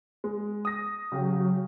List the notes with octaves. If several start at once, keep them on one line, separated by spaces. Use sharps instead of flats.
G#3
D#6 A#6
C#3 F#3 G4